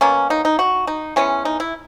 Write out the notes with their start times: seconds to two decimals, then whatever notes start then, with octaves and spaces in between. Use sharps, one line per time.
0.01 B2 F#3 A#3 C#4
0.30 D#4
0.45 D#4
0.59 F#4
0.87 D#4
1.16 E3 G#3 B3 C#4
1.45 D#4
1.60 E4